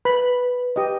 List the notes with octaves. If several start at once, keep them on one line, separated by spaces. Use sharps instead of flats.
B4 B5
G4 D#5